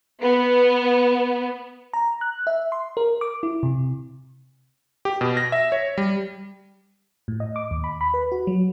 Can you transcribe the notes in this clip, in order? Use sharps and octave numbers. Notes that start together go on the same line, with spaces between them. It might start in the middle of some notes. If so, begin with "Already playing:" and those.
B3
A#5
F#6
E5
C6
A#4
D6
E4
C3
G4
B2
A#6
E5
C#5
G3
A2
D#5
D6
D#2
B5
B5
B4
F#4
F#3